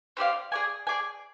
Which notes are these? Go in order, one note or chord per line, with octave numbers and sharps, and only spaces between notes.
C4 G4 D5 F5
G#4 D5 G#5
G#4 D5 G#5